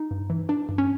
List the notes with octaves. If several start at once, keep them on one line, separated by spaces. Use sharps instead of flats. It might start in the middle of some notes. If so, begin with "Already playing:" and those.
Already playing: D#4
G2
E3
E3 D4
G2
C#4